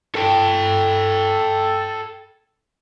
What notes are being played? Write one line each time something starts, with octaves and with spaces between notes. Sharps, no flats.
A4 G5